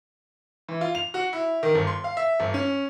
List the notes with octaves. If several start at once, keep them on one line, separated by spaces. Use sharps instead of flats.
E3
F4
F7
F#4
E4
D#3
G1
C6
F5
E5
G1
C#4